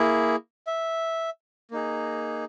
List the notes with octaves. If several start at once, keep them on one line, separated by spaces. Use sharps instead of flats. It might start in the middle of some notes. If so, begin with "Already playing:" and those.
Already playing: A#3 E4 G#4
E5
A#3 D#4 G#4